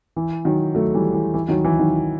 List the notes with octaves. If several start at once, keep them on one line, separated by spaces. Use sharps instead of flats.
E3
D#3 F#3
F#3 A3
E3 G3
E3
E3
D#3 F#3
E3
D#3 F#3